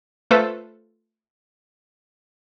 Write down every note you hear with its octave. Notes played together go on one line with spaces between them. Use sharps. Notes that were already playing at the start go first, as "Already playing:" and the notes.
A3 F4 A4 B4 C5